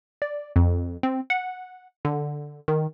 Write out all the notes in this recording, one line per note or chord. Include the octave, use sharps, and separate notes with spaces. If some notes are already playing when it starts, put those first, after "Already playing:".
D5
F2
C4
F#5
D3
D#3